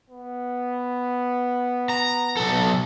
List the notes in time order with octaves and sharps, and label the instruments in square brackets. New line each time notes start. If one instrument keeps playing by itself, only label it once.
[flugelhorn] B3
[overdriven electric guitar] A#5
B1 A4